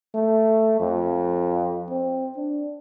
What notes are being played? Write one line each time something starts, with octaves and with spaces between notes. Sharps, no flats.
A3
F2
C4
D4